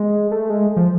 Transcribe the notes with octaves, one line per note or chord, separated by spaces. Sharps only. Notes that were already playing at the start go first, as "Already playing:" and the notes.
Already playing: G#3
A3
G#3
F3